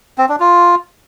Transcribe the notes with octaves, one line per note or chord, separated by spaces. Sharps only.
C4
D4
F4